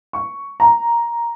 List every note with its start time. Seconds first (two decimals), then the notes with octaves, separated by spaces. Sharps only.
0.13 C#6
0.60 A#5